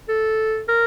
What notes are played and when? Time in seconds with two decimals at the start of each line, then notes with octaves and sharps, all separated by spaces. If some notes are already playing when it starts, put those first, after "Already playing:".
0.09 A4
0.68 A#4